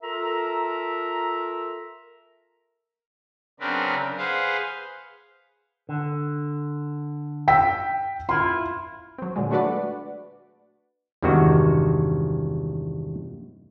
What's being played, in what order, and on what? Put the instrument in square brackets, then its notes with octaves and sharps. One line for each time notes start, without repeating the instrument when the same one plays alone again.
[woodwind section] F4 A4 A#4 E5 A#5
[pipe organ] C#3 F#3 C4 D4 A#4 B4
G#4 B4 C5 F5 F#5
[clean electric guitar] D3
[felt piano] G5 E6 B6
[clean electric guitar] E4 F4 [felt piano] C6
[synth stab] F#3 C4
A#2 D3 F#3 G#3
A3 D4 F#4 B4 D5 F#5
[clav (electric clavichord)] E2 G2 C3 D#3 G#3 F#4